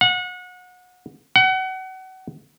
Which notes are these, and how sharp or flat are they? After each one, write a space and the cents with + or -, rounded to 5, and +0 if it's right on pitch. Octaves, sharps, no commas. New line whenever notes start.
F#5 -30
F#5 +30